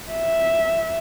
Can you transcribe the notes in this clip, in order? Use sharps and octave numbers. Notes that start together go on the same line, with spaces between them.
E5